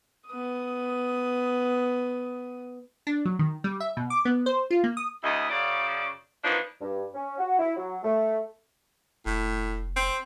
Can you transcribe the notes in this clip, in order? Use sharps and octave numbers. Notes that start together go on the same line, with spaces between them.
B3 D#6
D4
F#3
D#3
G3
E5
B2
D6
B3
C5
F4
A#3
D#6
D2 E4 D#5
F#2 C#3 D5
E3 F3 A#3 B3 D4 D#4
G2
C#4
F#4
E4
F#3
A3
F1 A2
C4